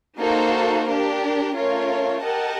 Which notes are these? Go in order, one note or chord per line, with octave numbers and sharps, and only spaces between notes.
A#3 D#4 F#4 A4 C5
D4 G4 A#4
A3 C#4 F4 A#4 C#5
G4 A#4 D#5 F#5 A5